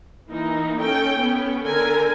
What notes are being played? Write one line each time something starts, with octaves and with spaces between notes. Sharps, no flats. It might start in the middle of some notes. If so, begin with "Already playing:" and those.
E3 A#3 D#4
C#4 A4 G5
B3 C#4
D3 A#4 G#5